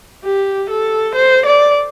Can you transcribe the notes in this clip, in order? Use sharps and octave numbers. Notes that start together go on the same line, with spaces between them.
G4
A4
C5
D5